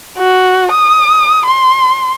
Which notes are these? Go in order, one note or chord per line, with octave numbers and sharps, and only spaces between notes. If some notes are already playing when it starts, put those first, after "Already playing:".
F#4
D#6
C6